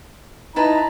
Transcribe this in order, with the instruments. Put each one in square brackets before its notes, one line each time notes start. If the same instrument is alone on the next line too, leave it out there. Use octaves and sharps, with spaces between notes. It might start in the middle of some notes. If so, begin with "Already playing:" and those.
[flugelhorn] D#4 [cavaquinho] E4 B4 A5 [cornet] A#5